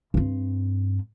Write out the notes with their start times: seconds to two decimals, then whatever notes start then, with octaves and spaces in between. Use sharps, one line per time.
0.14 G2 C4